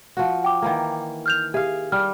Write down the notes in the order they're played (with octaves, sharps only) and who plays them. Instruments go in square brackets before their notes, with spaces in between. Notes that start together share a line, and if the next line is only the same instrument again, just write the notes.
[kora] F3 F#4
[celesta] G5 D6
[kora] D#3 E3 A#3
[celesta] F6 G6 F7
[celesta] G4 E5 [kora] G#4 F5
[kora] G3 [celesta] F6